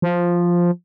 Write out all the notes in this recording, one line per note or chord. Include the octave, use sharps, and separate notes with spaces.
F3